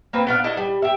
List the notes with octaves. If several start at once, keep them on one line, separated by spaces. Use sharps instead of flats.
A#3 C4 B4
B3 D4 F5
D4 E4 A4 D#5
G3
G4 E5